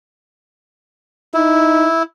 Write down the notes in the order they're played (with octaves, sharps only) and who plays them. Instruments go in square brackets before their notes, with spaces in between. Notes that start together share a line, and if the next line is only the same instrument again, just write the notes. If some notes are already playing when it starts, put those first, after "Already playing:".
[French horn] D#4 [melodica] E4